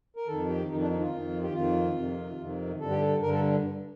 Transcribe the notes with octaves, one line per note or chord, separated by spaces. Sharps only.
A#4
F2 D#3 A4
G4
F2 D#3 D#4
D4
D#4
F4
F2 D#3
G4
F2 D#3 F4
F2 C3 D#3
F2 C3 D#3
G2 D3 A4
G4
A4
G2 D3 A#4
A4